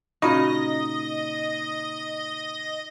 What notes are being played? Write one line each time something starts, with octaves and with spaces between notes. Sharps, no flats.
A#2 C#3 D#4 F#4 D#5 B5 C#6